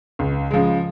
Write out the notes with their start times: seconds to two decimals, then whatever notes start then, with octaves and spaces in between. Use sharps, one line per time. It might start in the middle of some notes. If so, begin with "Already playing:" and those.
0.19 C#2
0.51 C#3 F3 G#3